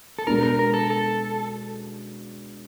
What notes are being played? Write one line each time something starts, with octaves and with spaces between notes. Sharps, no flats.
A4
B2 G#3 B3 D4 A#4
A#4
A#4
A4
A4